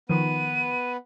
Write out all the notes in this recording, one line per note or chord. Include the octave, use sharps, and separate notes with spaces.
D#3 F3 B3 B4 D#7